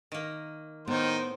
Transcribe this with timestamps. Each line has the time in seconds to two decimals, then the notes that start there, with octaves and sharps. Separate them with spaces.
0.12 D#3 A#3
0.88 A2 D#3 B3 C5